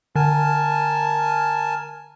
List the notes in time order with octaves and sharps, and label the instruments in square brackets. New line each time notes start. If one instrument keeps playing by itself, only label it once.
[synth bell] D3 [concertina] A#4 G#5 A5